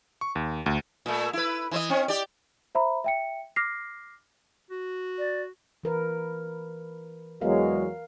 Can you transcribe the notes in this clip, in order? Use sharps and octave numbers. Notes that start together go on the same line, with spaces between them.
C#6
D#2
D2
A#2 A3
E4 B4
E3 C5 D#5
C4 C#4
G4 D5
C5 E5 A#5 B5
E5 G5 C#7
D6 F6 A#6 C7
F#4
D5
E3 A#4 B4
E2 F#3 G#3 A#4 F5